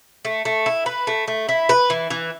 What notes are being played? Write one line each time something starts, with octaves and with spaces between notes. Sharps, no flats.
A3
A3
E4
B4
A3
A3
E4
B4
E3
E3